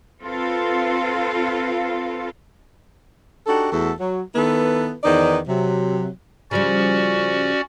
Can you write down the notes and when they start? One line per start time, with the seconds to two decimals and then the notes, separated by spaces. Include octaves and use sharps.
0.22 C4 F4 A4 B4 F5
3.47 D4 D#4 F#4 G4 A4
3.72 E2 A3 F#4 A4
3.99 F#3
4.35 D#3 B3 E4 A4 B4
5.04 E2 D#3 D#4 B4 C5 D5
5.47 C3 F#3
6.51 C#3 F3 G3 C#4 F#4 D5